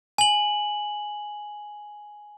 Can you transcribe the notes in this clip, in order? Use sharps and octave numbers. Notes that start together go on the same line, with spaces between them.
G#5 F#7